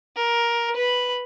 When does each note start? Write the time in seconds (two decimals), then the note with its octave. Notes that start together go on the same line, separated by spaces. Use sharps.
0.17 A#4
0.76 B4 B5